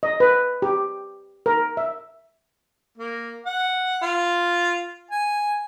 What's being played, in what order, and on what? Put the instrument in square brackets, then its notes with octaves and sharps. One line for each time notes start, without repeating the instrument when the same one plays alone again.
[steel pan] D#5
B4
G4
A#4
E5
[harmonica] A#3
F#5
F4
G#5